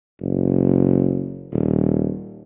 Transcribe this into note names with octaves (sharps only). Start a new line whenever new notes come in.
F#1
D#1